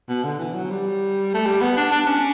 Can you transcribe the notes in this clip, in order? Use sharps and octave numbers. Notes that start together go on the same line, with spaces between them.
B2
D3
E3
F#3
G3
A3
G3
B3
D4
D4
C#4